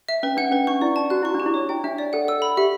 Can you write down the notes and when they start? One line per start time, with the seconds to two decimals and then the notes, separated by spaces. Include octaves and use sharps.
0.09 E5
0.23 C#4 B4
0.37 D4 F#5
0.52 C#4 B4
0.67 D4 C#6
0.81 E4 D5
0.96 A5
1.10 F#4 F#6
1.22 E4 C#6
1.34 D4
1.40 G4
1.46 E4
1.54 C#5
1.69 E4 G5
1.84 D4 E5
1.98 D5
2.13 A4 F#5
2.28 A4 E6
2.42 B5
2.57 G4 E5